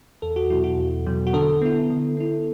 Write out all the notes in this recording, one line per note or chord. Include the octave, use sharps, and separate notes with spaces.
E2 A4
F#4
B2 F#3 E4
F#4
E2
B2 F#3
F#4
D3 A4
B3 E4
D3
B3 E4